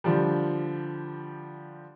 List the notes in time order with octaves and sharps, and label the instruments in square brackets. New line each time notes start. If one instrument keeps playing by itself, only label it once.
[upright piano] D3 F3 G3